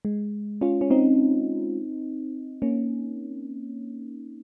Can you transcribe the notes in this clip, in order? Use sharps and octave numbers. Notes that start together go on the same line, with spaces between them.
G#3
C#4 F4
C#4
C4 D#4
A#3 C#4